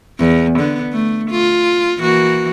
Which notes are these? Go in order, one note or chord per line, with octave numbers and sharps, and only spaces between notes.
E2
D3 B3
A3
F4
E3 A#3 F#4